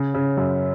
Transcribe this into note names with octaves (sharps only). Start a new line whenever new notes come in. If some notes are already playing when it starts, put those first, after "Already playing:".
Already playing: C#3
C#3
F#2